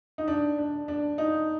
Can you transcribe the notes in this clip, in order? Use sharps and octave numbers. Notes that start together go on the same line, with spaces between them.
D#4
D4
D4
D4
D#4